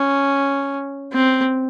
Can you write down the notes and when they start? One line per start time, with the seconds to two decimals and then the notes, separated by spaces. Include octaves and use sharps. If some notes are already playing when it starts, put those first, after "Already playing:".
Already playing: C#4
1.13 C4